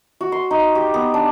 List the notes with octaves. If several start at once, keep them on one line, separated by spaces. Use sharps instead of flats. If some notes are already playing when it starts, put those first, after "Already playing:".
F#4
C6
D#4
G4
B3
D4